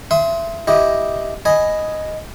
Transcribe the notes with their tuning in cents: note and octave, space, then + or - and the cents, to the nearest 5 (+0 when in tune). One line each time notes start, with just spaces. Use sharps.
E5 +20 C6 +0 D#6 +30
E4 +0 G4 +0 D#5 +0
D#5 +0 G#5 +0 B5 +0